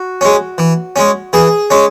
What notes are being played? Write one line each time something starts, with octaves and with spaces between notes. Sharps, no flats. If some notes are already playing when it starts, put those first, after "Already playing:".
Already playing: F#4
G#3 C#4
E3
G#3 C#4
E3 G#4
G#3 C#4